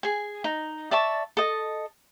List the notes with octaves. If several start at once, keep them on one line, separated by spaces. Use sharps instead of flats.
G#4 G#5
D#4
D5 E5 A5 C#6
A4 D#5